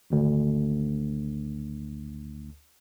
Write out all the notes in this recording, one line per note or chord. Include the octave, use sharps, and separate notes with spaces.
G#1 D2